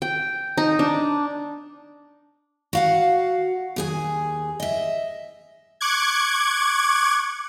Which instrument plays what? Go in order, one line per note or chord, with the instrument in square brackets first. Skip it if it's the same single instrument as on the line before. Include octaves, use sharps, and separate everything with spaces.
[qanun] G5
D#4
D4
[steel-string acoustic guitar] F#4 F5 F#5
D#2 G#4 G#5
D#5 E5
[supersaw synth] C#6 D6 F#6 G#6